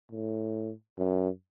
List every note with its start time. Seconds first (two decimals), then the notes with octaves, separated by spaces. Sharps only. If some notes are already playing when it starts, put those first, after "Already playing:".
0.11 A2
0.98 F#2